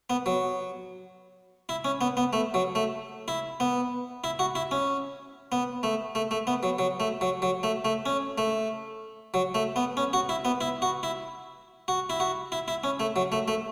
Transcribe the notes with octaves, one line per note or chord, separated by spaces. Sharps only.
B3
F#3
E4
C#4
B3
B3
A3
F#3
A3
E4
B3
E4
F#4
E4
C#4
B3
A3
A3
A3
B3
F#3
F#3
A3
F#3
F#3
A3
A3
C#4
A3
F#3
A3
B3
C#4
F#4
E4
B3
E4
F#4
E4
F#4
E4
F#4
E4
E4
C#4
A3
F#3
A3
A3